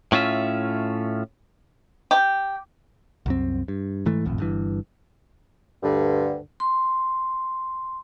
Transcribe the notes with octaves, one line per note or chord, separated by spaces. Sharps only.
A2 C#4 F4 E5
G4
C2 F#2 C4
G2
G#2 E3 A3
D#1 G#1 F2 A2
G1 G2 E3
D2 G2 D3
C6